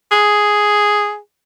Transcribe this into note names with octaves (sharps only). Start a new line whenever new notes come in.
G#4